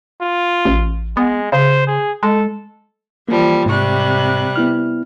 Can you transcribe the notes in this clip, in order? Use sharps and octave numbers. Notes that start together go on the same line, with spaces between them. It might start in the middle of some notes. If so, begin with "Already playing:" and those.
F4
A1
G#3 B3
C#3 C5
G#4
G#3 A4
E3 F3 G3 A#3 A5
G#2 C3 G3 C#6 F#6
B3 E4 F6